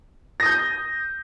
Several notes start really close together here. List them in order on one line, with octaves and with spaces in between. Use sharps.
A#6 D#6 G6